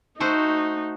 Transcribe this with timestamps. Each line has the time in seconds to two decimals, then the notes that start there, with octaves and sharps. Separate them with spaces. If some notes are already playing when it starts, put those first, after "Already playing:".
0.20 A3 D#4 F#4 C5